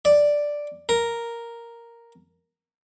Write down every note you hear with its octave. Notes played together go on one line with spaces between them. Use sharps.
D5
A#4